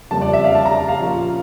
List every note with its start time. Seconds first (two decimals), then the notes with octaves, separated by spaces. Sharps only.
0.11 F2 C#3 G3 A#3 A5
0.21 D5
0.33 E5
0.44 F5
0.55 A5
0.65 A#5
0.77 A5
0.88 F5
0.99 A#2 F3 A#3 C#4